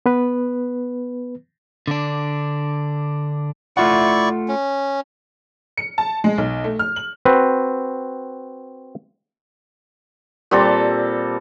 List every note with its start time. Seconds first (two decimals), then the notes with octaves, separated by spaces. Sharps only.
0.06 B3 B4
1.88 D3 D4
3.77 A3 E4 F4 D5 F#5 C#6
4.48 C#4
5.77 C#7
5.98 A5
6.24 G#3
6.38 B1
6.64 A3
6.79 F6
6.96 F#7
7.25 C4 F#4 B4
10.51 A#2 G3 C4 A4